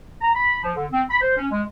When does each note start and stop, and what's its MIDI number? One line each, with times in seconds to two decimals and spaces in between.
0.21 0.30 82
0.35 0.61 83
0.63 0.72 53
0.75 0.86 50
0.91 1.02 60
1.09 1.21 83
1.22 1.37 72
1.37 1.46 61
1.51 1.62 56